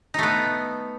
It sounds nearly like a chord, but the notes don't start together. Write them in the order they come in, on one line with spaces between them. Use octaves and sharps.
D#4 A3 B3